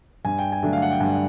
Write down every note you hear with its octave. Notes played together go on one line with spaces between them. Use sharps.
G2 G#5
G5
G#5
D3 F#3 A3 D4
F5
F#5
G5
G2 G#5